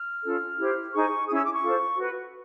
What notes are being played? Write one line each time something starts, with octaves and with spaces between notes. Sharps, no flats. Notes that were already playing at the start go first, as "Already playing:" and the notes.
Already playing: F6
C#4 F4 A4
E4 G4 C5
D#4 G#4 C5 C#6
C#4 E4 G#4 D#6
E6
D6
C#6
F4 A4 C5
F#4 B4